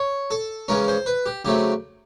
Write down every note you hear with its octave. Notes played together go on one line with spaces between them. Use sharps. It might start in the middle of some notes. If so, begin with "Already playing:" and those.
Already playing: C#5
A4
C#3 E3 G#3 C#4 A#4
C5
B4
G4
C#3 F#3 A3 C4 G4